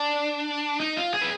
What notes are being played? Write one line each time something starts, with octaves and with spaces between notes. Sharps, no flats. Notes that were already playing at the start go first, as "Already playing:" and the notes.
Already playing: D4
D#4
F4
G#4
B4